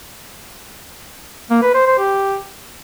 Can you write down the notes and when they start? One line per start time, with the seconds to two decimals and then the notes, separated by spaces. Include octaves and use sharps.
1.50 A#3
1.62 B4
1.74 C5
1.86 C5
1.98 G4